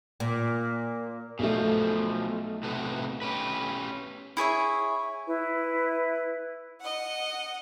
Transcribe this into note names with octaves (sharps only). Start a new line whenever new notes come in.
A#2
B1 B2 F3 A3
A2 C3 B3
C#4 G4 B4
E4 G#4 C#5 E5
E4 B4
D#5 F#5